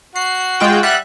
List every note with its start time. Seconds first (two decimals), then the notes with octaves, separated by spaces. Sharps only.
0.16 F#4 C7
0.60 G#3 F4 G5
0.83 G3 E5 F#5 F#6